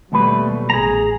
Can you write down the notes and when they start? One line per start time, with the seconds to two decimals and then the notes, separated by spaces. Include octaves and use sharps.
0.12 D#2 B2 F#3 G3 A3 B4
0.70 A1 G#4 A#5